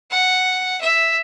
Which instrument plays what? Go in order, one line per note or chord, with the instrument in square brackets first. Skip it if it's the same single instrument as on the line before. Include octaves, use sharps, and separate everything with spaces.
[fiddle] F#5
E5